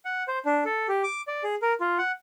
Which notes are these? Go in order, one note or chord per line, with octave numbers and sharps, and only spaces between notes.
F#5
C5
D4
A4
G4
D6
D5
G#4
A#4
F4
F#5